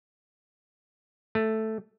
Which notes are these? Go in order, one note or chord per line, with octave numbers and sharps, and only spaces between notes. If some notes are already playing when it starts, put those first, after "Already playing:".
A3